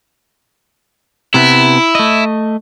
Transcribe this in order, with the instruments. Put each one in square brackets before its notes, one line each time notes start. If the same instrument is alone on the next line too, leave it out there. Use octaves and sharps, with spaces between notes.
[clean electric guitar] C3 B3 [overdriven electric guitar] E4
[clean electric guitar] A3 D#5